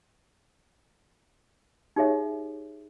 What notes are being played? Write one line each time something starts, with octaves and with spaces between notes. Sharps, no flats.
D#4 G4 G#4 C#5 E5